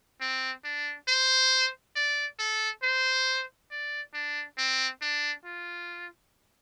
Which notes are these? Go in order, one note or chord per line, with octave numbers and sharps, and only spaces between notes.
C4
D4
C5
D5
A4
C5
D5
D4
C4
D4
F4